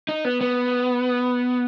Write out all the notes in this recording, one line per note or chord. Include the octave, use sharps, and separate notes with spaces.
D#4
B3
B3